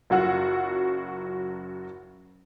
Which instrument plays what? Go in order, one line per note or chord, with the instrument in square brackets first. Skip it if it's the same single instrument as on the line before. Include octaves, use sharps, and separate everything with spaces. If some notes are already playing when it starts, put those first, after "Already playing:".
[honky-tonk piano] F#1 F#3 F4 F#4 F#5 E6